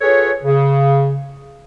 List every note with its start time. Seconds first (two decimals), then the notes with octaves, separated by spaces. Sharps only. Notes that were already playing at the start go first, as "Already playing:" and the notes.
0.01 F4 G#4 A4 B4 C#5
0.43 C#3